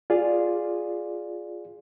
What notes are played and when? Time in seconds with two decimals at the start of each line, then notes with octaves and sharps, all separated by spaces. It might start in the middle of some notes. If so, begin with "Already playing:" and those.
0.10 F4 G#4 D5